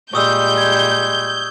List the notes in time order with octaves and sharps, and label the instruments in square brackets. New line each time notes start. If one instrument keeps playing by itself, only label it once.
[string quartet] A#2 G3 G#3 [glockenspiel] C#6 D#6 E6 [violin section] G6
[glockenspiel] G#6